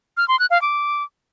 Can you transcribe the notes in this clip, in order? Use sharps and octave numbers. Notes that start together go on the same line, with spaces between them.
F6
C6
F#6
F5
D6